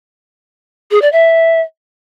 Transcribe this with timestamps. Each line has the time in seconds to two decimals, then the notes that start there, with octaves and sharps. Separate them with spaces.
0.91 G#4
1.02 D5
1.12 E5